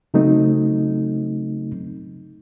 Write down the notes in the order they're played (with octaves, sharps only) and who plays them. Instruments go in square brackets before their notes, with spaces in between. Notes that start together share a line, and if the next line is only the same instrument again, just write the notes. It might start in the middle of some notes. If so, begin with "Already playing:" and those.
[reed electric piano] C#3 F#3 A3 C4 D#4